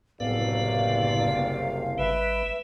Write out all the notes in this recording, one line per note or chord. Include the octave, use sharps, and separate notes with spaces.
F#1 C2 A2 C3 B3 B4 D5 F5
G#1 G3 B4 E5